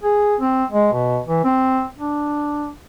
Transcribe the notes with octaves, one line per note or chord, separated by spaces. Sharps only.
G#4
C4
G#3
B2
E3
C4
D4